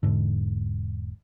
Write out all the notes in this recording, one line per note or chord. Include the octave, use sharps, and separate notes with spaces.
E1 G#2 D3